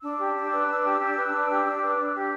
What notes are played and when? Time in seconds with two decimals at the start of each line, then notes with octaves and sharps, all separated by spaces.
0.01 D4 E6
0.18 G4
0.34 D4
0.50 B4
0.67 D4
0.83 G4
1.00 D4
1.16 B4
1.31 D4
1.48 G4
1.64 D4
1.81 B4
1.97 D4
2.13 G4